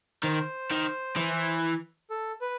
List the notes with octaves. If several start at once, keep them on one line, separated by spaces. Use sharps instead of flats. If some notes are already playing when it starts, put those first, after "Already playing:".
D#3 C5
D#3
E3
A4
B4